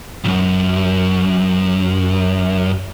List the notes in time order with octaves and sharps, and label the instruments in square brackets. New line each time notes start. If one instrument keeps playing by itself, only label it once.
[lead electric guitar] B1 F#2